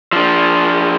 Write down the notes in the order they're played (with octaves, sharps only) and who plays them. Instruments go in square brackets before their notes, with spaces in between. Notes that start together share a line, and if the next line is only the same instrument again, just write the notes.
[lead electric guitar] F3 D4